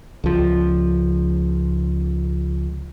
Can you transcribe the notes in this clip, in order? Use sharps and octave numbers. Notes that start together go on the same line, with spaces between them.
C#2 F3